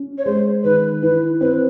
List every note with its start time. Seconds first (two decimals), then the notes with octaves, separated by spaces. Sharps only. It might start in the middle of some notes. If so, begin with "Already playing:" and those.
Already playing: C#4
0.18 C#5
0.25 G#3 C5
0.64 D#3 B4
1.02 E3 B4
1.41 C4 B4